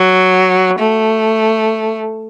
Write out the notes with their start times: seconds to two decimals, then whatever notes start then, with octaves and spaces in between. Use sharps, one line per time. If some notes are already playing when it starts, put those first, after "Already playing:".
Already playing: F#3
0.79 A3